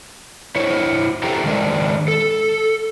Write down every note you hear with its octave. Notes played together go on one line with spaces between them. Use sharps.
E4 C5 C#5
E4 G4 A4 C5 G5 A#5
D#3 G#3 D4
A4